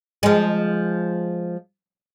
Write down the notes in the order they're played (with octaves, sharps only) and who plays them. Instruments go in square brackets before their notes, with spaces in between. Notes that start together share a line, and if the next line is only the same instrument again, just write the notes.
[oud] F3 G#3